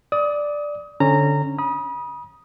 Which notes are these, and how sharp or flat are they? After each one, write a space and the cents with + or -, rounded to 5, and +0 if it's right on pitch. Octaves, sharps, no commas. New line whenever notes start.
D5 +0 D#6 +25
D3 -10 C#4 -20 A#5 -15
B5 -40 D#6 +0